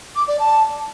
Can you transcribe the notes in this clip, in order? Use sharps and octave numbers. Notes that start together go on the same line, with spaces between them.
D6
D5
A5